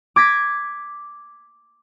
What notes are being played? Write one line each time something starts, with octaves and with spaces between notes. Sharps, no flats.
D6 G#6 A#6 B6